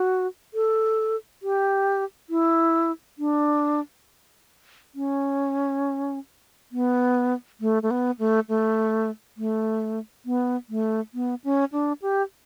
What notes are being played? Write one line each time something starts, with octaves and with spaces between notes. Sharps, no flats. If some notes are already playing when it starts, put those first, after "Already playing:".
Already playing: F#4
A4
G4
E4
D4
C#4
B3
A3
A3
B3
A3
A3
A3
B3
A3
B3
C#4
D4
G4